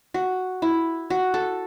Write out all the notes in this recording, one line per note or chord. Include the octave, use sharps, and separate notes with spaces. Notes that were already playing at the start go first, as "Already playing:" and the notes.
F#4
E4
F#4
A4